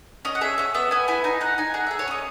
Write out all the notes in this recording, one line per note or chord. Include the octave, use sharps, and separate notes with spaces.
C#4 D#5
F#5
G#4 E5
C#4 E5
B3 E5
B3 G#5
E4 G#5
D#4 G#5
D#4 F#5
D#4 G#5
G#4 F#5
G#4 E5
C#5
C#4 D#5